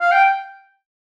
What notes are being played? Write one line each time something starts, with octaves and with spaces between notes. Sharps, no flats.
F5
G5